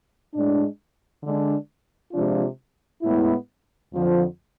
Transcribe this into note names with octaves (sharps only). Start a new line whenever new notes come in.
A2 G#3 D4
D3 G#3 D4
C3 F3 G#3 D4 F4
A2 G#3 B3 E4
F2 D3 F3